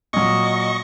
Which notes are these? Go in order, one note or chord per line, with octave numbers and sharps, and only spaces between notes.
A#2 F#3 D#5 C#6